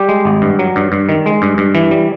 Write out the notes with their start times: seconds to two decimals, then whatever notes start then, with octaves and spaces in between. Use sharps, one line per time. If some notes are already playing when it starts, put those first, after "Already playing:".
Already playing: G3 G4
0.08 G#3
0.25 G#1
0.42 G2
0.59 F#3
0.76 G2
0.92 G2
1.09 D#3
1.26 G#3
1.42 G2
1.58 G2
1.75 E3
1.91 G3